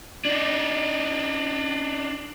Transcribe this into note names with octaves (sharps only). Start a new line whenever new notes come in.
D4 D#4